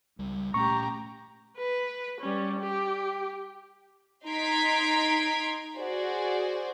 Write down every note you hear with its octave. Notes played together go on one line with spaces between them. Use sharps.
C#2 G3
A#2 A3 C#4 G4 A#5 C#6
B4
G3 C#4
G4
D#4 A#5 C6 G#6 B6 D7
F#4 G#4 C5 D5